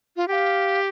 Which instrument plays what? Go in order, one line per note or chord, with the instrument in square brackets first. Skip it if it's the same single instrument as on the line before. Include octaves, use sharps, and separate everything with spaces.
[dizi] F4
[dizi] G4 [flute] G5
[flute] F5